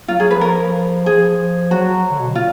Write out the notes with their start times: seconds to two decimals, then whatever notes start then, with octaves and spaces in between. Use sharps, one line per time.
0.08 F#3 F4
0.20 F#3 G#4
0.30 F3 B4
0.41 A#4
1.06 F3 G#4
1.71 F#3 F#4
2.11 D3
2.19 B2
2.35 A#2 F4